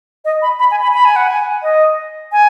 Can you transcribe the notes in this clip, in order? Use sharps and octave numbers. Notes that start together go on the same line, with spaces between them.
D#5
B5
B5
G#5
B5
B5
G#5
F#5
G#5
D#5
G#5